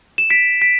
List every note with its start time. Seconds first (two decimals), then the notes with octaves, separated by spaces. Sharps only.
0.18 E7
0.30 B6 D7
0.62 B6 D7